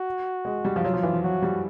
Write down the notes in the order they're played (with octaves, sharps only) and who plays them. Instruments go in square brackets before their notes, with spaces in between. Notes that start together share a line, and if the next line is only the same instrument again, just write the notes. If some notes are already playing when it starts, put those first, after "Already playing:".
Already playing: [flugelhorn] F#4
[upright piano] G#3
G3
F3
[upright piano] F#3 [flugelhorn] F4
[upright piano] F3
E3
F3
[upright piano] F#3 [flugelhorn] F#4
[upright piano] G3